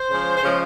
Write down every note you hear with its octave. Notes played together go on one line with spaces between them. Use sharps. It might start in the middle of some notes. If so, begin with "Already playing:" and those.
Already playing: C5
C#3 F3 G#3
C5
C#3 F3 G#3 C#5